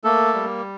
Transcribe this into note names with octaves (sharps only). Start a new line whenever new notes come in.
A3 A#3 A4
G3